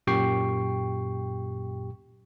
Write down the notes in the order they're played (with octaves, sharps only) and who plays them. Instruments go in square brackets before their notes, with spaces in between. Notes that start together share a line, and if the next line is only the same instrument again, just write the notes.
[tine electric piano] F#2 A#2 G4 G5 C#6 C7